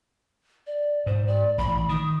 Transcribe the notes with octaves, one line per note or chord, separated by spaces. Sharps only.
D5
G#2 C5
D5
A1 B5
D#3 D#6